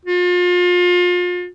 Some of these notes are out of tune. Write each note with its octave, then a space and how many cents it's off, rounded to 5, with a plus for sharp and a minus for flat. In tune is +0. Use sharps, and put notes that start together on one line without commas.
F4 +35